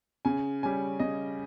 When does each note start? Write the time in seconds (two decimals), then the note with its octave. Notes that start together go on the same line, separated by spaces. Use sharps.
0.25 C#3 G#5
0.63 G3 C#4 G#5
1.00 C#3 D#5